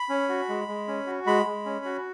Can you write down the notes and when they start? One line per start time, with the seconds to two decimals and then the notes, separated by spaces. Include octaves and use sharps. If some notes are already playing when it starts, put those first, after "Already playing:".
Already playing: B5
0.09 C#4
0.29 F#4
0.49 G#3
0.68 G#3
0.88 C#4
1.07 F#4
1.26 G#3 B5
1.46 G#3
1.66 C#4
1.85 F#4